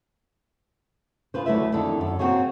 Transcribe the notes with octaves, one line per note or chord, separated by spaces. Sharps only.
F4 G#4 B4 C5
D2 F#3 A3 E4 B4 E5
F2 D3 D#3 E4 A4
F#2 A4
A#3 C4 F#4 G#4 C#5